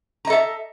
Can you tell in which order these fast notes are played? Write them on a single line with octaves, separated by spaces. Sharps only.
A#5 D#5 A4 E5